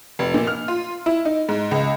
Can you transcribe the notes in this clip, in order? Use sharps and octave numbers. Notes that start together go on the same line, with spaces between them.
F1
A#2
F6
F4
E4
D#4
G#2
C#2